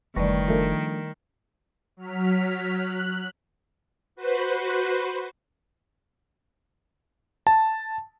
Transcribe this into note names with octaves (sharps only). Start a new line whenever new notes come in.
F#1 E2 D#3 G3 A3 B4 D5 C#6
F3 A3 D4 A#4
F#3 F6 B6
F#6
F#4 B4 C5
A5